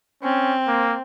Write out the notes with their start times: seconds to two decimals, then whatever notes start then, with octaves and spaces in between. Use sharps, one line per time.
0.23 C4 C#4
0.67 A#3